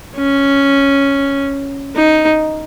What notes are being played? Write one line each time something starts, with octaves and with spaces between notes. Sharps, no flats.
C#4
D#4